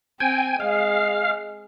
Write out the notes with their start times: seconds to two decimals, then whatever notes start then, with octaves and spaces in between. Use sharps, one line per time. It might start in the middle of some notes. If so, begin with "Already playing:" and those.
0.20 C4 G5 G#5
0.60 G#3 F5